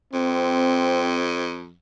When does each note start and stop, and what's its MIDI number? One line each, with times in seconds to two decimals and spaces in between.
0.13 1.73 41
0.13 1.21 60